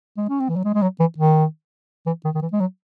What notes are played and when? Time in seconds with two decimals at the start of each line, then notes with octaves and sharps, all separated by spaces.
0.17 G#3
0.29 C#4
0.40 C4
0.49 E3
0.56 F#3
0.64 G#3
0.75 G#3
0.82 F#3
1.00 E3
1.18 D#3
2.06 E3
2.25 D#3
2.35 D#3
2.42 E3
2.53 G#3
2.60 F#3